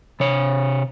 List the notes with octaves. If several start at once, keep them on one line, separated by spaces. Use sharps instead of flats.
C3 C#5